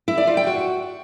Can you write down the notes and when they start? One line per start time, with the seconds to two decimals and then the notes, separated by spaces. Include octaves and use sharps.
0.08 E4
0.18 D5
0.27 F4
0.37 G5
0.47 F#4